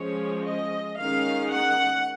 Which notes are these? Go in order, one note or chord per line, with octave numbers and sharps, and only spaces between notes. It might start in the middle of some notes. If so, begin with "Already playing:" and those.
Already playing: F3 G#3 C#4 C#5
D#5
D#3 G#3 C#4 F5
F#5